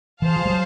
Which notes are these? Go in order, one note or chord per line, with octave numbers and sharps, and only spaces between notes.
E3 G#4 C5 F5 A5
F3
G3
F#3